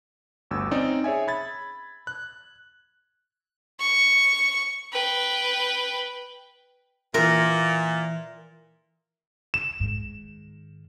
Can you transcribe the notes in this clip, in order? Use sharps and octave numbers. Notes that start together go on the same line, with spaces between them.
G1 D2 E6
C4 C#4 D#4 D5
G#4 C#5 E5 G#5
B5 G#6 A6
F#6
C#6
B4 G5
A#2 E3 A#4 E5
E7
G#2 D#3